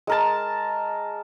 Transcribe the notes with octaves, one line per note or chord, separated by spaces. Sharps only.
G#3 A#4 A5